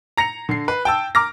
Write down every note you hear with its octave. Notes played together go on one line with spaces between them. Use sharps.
A#5 A#6 C#7 F7
D3 C7
B4
G5 A5 E6
A#5 D6 F6 A#6